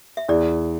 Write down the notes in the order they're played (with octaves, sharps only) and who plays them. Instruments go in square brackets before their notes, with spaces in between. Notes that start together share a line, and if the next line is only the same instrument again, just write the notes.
[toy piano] E5
[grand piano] E2 [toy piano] D5